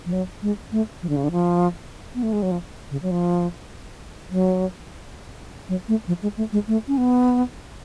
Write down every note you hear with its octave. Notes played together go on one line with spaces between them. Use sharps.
F3
F#3
G#3
A3
F3
D3
C#3
D3
F3
B3
A3
G#3
F#3
F3
C#3
F#3
F3
F#3
F#3
A3
F3
G#3
A3
G#3
A3
C#4
B3